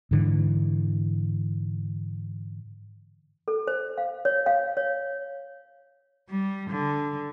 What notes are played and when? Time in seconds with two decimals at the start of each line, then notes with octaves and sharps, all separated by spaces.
0.11 G#2 D3 E3
3.48 A4
3.67 C5
3.98 F5
4.25 C#5
4.46 F5
4.77 C#5
6.29 G3
6.70 D3